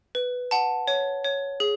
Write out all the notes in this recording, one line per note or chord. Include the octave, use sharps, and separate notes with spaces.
B4
F#5 A5
C#5
C#5
G#4